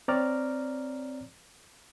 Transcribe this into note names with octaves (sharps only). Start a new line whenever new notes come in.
C4 C#5 D5 A#5 D6 F6